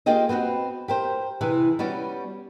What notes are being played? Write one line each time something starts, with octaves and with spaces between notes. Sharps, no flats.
A#3 F4 G4 G#4 D#5
B3 C4 F4 F#4
G4 A#4 C5
C3 E3 G#4
G3 B3 C#4 F#4 D5